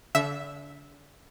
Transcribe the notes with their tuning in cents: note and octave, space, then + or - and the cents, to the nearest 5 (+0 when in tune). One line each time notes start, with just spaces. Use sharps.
D3 -35 E5 -5